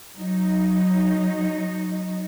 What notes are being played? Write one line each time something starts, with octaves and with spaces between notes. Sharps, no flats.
F#3 D#4